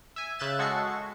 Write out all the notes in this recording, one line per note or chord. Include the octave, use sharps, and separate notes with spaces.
E5 G#5
C#3 E5 F#6 G6 A6 E7
G#3 F#4 A4 C#6 C7 C#7